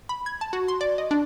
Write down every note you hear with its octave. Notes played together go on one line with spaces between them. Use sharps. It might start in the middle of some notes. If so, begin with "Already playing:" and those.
B5
G#6
A5
F#4
C6
D5
D#5
D4